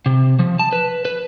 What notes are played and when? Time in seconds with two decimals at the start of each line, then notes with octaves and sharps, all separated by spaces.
0.06 C3
0.39 F3
0.59 A5
0.73 B4
1.05 B4